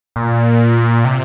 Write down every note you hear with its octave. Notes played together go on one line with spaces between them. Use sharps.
A#2
C3